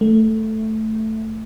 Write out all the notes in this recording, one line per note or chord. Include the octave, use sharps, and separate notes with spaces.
A3